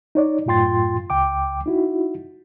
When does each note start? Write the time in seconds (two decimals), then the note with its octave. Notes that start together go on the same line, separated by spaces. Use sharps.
0.15 D#4 C#5 D5
0.46 F#2 A2 F4 G5 C6 A6
1.10 C#2 G5 D6
1.66 D#4 E4 F#4